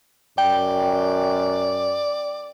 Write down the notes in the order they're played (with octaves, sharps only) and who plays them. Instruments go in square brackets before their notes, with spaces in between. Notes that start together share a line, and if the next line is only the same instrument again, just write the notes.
[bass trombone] F#2 [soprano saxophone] D5 [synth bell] G5